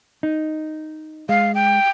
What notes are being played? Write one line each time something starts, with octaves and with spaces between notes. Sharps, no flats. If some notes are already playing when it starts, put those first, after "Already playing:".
D#4
G#3 F5
G5